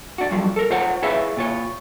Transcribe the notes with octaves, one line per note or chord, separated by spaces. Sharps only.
D4 F#4
G2 F3 F#3
A4 A#4
F4 C5 C#5 F#5
E4 G#4 B4 C#5 E5 F5
A#2 F4 C#5